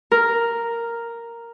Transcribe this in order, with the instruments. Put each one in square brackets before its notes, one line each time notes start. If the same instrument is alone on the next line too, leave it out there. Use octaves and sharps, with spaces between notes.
[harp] A#4